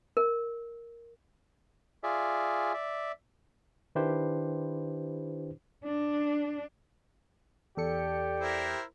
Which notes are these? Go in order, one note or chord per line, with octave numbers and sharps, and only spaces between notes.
A#4
F4 G#4 D5 E5
D5 E5
D#3 D4 E4 G4 B4 C5
D4
E2 G4 A4 D5 C#7
E4 A#4 C5